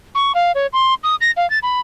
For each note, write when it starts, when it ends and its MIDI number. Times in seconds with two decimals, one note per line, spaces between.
0.15 0.32 85
0.35 0.52 77
0.55 0.67 73
0.73 0.94 84
1.03 1.15 87
1.21 1.31 94
1.37 1.48 77
1.50 1.59 93
1.63 1.80 83